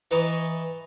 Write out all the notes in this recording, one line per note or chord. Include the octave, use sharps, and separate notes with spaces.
E3 B4 D#5 A5 A#5 C#6